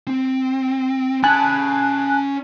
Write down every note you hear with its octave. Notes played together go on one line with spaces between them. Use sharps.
C4
C#4 G#5 A5 B5 F#6